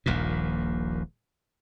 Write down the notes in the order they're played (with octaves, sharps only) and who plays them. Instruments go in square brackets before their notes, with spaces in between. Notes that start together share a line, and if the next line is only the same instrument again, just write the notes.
[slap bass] D#1 A#1 D#2 A#2